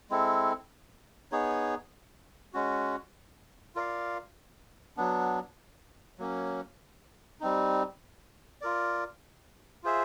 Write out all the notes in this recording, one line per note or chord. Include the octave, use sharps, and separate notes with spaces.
G#3 C4 E4 A4
B3 D#4 G#4 C#5
G#3 C#4 F#4
F4 A#4 D5 F5
F#3 B3 D4
F#3 A#3 C#4
G3 C4 D#4
F4 A#4 D5
F4 G#4 C5 E5